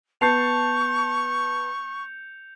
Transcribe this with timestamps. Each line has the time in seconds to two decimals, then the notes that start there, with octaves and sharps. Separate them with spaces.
0.21 B3 A5 C#6 G6 C7 C#7 F7